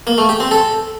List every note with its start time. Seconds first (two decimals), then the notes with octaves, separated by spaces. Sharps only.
0.07 A#3
0.18 A3
0.29 G4
0.40 C4
0.51 A4